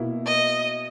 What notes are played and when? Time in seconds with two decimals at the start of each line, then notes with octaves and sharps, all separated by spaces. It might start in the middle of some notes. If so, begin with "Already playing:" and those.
Already playing: B2 A#3 E4
0.26 D#5